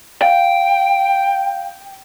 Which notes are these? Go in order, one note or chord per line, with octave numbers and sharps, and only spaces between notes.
F5 G5